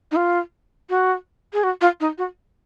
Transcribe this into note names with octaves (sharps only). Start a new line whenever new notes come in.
D#4
F4
F#4
G#4
F#4
F4
D#4
F#4